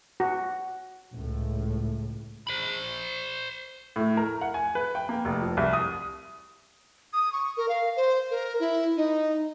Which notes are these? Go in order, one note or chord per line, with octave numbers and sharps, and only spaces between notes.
F#4
C#2 A2
C5 B5
A2
A#4
F#5
G#5
B4
G5
A#3
F1
F3
C2
D#6
D#6
C#6
A#4
F5
C5
A#4
E4
D#4